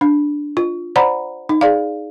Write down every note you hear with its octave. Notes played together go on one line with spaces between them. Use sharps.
D4
F4
C5 D5 F#5 A#5 B5
D#4
G#4 D5 F5